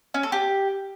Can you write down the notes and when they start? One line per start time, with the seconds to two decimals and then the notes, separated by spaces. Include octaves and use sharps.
0.14 C#4
0.23 A4
0.32 G4